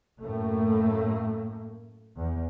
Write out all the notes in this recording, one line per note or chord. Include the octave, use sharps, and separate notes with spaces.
F#2 A2 A3 A#3
E2